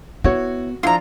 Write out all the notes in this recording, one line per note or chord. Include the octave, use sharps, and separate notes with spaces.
B3 E4 F#4 C#5
F3 D4 E4 F4 A#5 C6